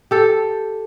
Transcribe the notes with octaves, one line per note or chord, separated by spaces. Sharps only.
G4 A4